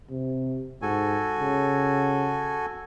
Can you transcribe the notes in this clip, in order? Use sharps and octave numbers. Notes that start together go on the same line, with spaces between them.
C3
G#2 F#4 A4 G#5
C#3